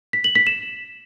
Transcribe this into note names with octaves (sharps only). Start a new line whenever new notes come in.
B6
F#7
B6
E7